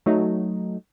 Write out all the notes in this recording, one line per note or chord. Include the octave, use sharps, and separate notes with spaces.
F#3 A3 D#4